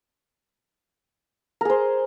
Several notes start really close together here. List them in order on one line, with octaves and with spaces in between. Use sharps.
A#4 G#4 C5